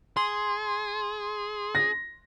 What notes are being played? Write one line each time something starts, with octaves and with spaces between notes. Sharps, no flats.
G#4 C6
A#6